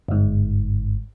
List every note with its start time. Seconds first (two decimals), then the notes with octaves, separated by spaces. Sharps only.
0.08 G1 G#2